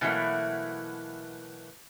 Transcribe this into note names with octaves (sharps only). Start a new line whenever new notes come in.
B2 E3 F#3 A3 A#3